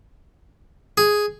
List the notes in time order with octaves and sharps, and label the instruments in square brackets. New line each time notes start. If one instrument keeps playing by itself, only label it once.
[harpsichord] G#4